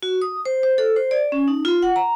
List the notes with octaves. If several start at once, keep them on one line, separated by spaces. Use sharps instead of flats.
F#4
D#6
C5
C5
A4
C5
D5
C#4
D#4
F4
F#5
A#5